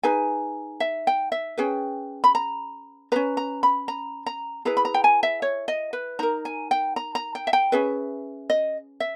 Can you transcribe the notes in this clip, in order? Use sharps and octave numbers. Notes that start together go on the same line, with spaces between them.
D#4 G#4 B4 G#5
E5
G5
E5
C#4 G#4 B4 G5
B5
A#5
C#4 G#4 B4 A#5
A#5
B5
A#5
A#5
E4 G#4 B4 A#5
B5
A#5
G5
G#5
E5
C#5
D#5
B4
D#4 A#4 A#5
G#5
G5
A#5
A#5
G5
E5
G5
C#4 G#4 B4 E5
D#5
E5